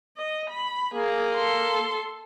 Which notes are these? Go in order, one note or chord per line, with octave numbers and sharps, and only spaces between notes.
D#5
B5
A#3 G#4
A4 C6